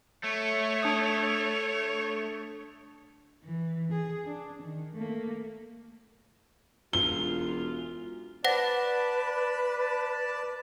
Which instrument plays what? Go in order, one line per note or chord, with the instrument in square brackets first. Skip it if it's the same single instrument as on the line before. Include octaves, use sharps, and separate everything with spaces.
[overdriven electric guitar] A3 [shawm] C#5
[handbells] D4 D#6
[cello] E3
G#4
D4
D#3
A3 A#3
[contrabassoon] E1 [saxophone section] F#2 F4 [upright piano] G7
[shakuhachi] B4 [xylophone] C5 F#5 A#6 [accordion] D5 A5